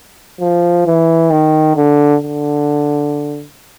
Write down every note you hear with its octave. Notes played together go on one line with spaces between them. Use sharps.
F3
E3
D#3
D3
D3